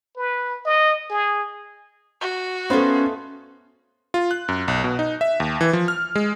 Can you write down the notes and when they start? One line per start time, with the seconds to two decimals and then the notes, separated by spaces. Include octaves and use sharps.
0.17 B4
0.65 D#5
1.10 G#4
2.21 F#4
2.70 A3 B3 C#4 D#4 F4 C5
4.14 F4
4.31 F#6
4.48 F#2
4.68 B1
4.84 B2
4.99 D#4
5.21 E5
5.40 D#2
5.61 E3
5.73 F3
5.88 F6
6.15 G#3